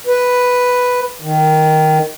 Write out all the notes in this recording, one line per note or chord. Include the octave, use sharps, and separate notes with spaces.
B4
D#3